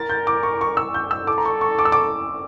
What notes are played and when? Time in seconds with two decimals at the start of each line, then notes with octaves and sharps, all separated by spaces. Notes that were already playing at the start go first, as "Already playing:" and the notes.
Already playing: A#4 A6
0.10 G6
0.27 D6
0.43 C#6
0.61 C#6
0.77 E6
0.94 G6
1.11 E6
1.27 A4 D6
1.38 A#5
1.45 C#6
1.61 C#6
1.79 D6
1.85 E6
1.92 D6